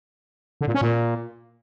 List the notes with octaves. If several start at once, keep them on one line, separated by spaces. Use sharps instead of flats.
D3
A#2
C#4
A#2